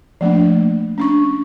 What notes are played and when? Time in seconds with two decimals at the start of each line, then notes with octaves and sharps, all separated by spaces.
0.21 F3 A3 A#3 D4
0.98 C#4 D4 C#6